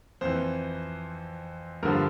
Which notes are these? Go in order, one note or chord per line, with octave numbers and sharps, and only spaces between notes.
F2 E3 C5
G2 D3 F3 A#4